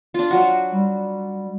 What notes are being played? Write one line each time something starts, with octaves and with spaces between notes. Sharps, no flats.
D4 F4
F#3 F#4
G3